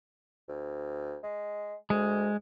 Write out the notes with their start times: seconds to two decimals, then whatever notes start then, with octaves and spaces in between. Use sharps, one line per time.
0.48 D2
1.23 G#3
1.90 D2 G#3